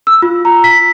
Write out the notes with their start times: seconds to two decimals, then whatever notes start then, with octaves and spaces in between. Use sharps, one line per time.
0.07 E6
0.22 F4
0.45 A#5
0.64 B6